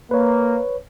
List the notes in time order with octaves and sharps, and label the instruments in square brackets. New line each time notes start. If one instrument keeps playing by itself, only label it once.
[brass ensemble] A#3 [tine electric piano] B4 C#5